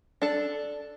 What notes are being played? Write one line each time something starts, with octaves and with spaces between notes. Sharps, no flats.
D4 A4